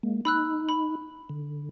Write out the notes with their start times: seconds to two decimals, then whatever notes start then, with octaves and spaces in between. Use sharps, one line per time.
0.03 G#3 A#3
0.25 D#4 B5 E6 F#6
0.69 B5
1.29 D3